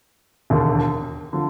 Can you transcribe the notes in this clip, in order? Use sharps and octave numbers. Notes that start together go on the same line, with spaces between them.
E1 D#2 D3
D3 F3